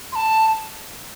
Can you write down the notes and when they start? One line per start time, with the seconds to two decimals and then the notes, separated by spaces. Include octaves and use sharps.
0.12 C6
0.15 A5